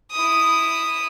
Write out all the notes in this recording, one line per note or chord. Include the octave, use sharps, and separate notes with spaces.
E4 D#6